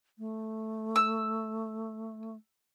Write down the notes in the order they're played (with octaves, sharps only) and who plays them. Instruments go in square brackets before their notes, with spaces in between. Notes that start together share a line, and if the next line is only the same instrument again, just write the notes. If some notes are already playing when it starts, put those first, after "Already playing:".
[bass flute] A3
[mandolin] E6